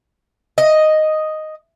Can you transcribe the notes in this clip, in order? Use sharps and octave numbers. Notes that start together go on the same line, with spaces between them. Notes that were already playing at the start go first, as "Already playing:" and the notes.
D#5